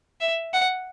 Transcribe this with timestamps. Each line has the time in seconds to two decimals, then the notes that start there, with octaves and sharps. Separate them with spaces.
0.20 E5
0.54 F#5